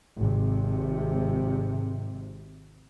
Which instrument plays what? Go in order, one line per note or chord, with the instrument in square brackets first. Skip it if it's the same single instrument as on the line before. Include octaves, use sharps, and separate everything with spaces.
[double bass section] G#1 C3